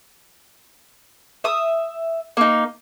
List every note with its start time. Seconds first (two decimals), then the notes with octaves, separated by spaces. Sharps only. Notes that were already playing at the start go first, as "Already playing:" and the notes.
1.44 E5 D#6
2.37 A#3 D#4